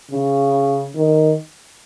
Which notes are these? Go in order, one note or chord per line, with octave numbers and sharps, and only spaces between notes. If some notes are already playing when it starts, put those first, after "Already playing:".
C#3
D#3